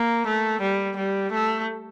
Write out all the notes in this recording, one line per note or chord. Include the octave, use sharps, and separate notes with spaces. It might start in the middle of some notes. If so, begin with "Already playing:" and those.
Already playing: A#3
A3
G3
G3
A3